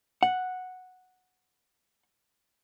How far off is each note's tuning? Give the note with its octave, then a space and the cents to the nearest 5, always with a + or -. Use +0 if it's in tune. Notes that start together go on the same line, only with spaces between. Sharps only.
F#5 -5